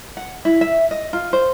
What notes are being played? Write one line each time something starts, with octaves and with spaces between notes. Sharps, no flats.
F#5
E4
E5
D#5
F4
C5